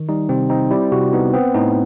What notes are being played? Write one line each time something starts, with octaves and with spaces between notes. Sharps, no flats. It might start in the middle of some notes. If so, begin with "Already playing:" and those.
Already playing: D#3
G3 D#4
C3 C4
C4 D#4
G3 E4
C3 F#4
B3 D#4
B3 C4
A2 D#4